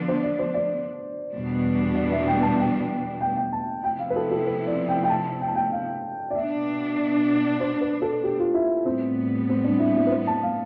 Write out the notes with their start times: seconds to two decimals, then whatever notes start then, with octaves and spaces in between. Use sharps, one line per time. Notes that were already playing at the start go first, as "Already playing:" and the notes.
Already playing: D3 F3 B3 D4
0.08 C5
0.23 D5
0.39 C5
0.54 D5
1.33 E2 B2 G3 B3 D4
1.96 D5
2.11 E5
2.27 G5
2.42 A5
2.59 G5
3.21 G5
3.37 G5
3.52 A5
3.84 C3 F3 B3 E4 G5
3.99 F5
4.10 B4
4.16 A4
4.31 A4
4.47 B4
4.67 D5
4.88 G5
5.03 G5
5.09 A5
5.41 G5
5.48 A5
5.55 G5
5.72 F5
6.30 D5
6.35 B2 B3 D4 E5
7.60 C5
7.81 B4
8.02 A4
8.23 G4
8.39 F4
8.54 E4
8.85 A2 G3 B3 C4
9.49 C4
9.64 D4
9.80 E4
9.96 E4
10.07 B4
10.11 C5
10.27 A5
10.43 F5